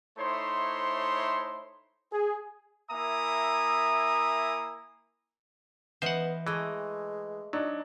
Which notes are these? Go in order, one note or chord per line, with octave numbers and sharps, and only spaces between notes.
A3 D#4 E4 C5 C#5 C6
G#4
A#3 E4 E5 G#5 A#5 D#6
E3 B3 C5 D#5 F5 F#5
E3 G#3 A3 D#5
F#3 D4 D#4